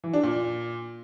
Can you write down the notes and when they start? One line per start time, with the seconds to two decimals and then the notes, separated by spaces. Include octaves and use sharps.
0.04 E3
0.13 D4
0.23 A#2